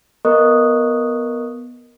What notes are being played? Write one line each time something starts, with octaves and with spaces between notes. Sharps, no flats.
B3 A#4 D#5 C#6 D#6 F#6